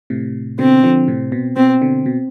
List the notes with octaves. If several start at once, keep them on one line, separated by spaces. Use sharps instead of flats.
A2 C3
B2 D3 C4
D3 F3
A2 C3
B2
B2 C4
B2 D3
B2